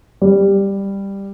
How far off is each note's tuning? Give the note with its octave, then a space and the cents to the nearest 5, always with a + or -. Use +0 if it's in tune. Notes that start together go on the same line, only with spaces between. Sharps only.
G3 +10